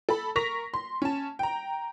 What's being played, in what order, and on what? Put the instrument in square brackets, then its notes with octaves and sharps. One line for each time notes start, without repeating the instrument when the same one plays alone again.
[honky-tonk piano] A4 B5
A#4 C#6 A#6 B6 F7
C6
C#4 A5
G5 A#5